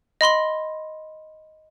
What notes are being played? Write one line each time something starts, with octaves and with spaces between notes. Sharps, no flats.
D#5 B5 C6 G7